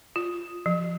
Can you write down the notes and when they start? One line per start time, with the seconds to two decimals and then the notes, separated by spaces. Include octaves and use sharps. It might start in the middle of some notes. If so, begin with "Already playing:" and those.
0.16 F4
0.66 F3